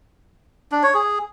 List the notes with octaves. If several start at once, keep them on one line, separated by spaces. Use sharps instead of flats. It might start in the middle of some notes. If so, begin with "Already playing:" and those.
D4
C#5
G#4